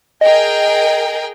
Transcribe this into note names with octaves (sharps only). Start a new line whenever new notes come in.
G#4 A#4 D#5 G5